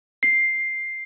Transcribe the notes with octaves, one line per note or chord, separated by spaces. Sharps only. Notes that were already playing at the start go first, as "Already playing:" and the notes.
C7